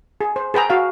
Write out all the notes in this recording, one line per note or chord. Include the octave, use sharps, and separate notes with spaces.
G#4
C5
G#4 B4 G5 A#5
F#4 F5